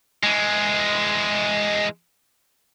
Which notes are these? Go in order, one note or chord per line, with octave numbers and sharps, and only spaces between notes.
E3 G#3